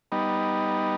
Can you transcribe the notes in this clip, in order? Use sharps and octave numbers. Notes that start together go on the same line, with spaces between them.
G3 B3 D#4